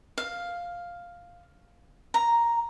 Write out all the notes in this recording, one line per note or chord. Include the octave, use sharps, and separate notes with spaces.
F5
A#5